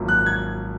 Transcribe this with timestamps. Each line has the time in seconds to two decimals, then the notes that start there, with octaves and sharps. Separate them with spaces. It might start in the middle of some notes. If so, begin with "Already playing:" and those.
Already playing: G#1 F#2 F3 A#3
0.08 F#6
0.26 G#6